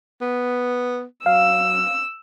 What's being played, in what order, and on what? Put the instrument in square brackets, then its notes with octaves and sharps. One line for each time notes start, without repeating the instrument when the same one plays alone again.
[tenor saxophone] B3
[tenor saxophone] F#3 [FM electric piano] F5 [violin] E6